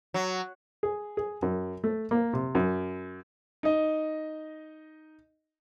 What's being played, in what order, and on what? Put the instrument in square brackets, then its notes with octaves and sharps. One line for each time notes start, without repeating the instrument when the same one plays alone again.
[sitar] F#3
[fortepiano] G#4
G#4
F#2
A3
A#3
C3
F#2
[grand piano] D#4 D#5